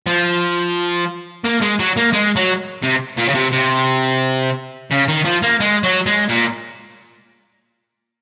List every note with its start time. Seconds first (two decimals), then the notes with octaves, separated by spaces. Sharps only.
0.06 F3
1.44 A#3
1.61 G#3
1.79 F#3
1.97 A#3
2.13 G#3
2.36 F#3
2.83 C3
3.18 A#2
3.29 C#3
3.35 C3
3.52 C3
4.91 C#3
5.08 D#3
5.25 F3
5.43 A#3
5.60 G#3
5.83 F#3
6.06 G#3
6.29 A#2